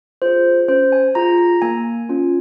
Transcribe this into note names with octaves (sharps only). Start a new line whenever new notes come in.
F4 G#4 C5
C#4 C5
G#5
F4 G#4 A#5
A#5
A#3 G#5
C#4 F4